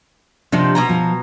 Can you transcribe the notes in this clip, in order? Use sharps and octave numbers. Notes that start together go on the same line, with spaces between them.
C3 D#3 F3 D4
B2 G#5 A#5
F3